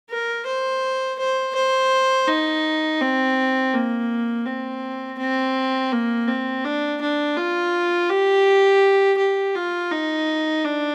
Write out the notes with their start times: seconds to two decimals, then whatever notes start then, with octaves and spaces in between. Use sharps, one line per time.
0.10 A#4
0.46 C5
1.19 C5
1.55 C5
2.28 D#4
3.01 C4
3.74 A#3
4.46 C4
5.19 C4
5.92 A#3
6.28 C4
6.64 D4
7.01 D4
7.37 F4
8.10 G4
9.18 G4
9.55 F4
9.91 D#4
10.64 D4